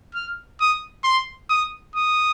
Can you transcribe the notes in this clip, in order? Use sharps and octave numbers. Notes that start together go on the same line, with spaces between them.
F6
D#6
C6
D#6
D#6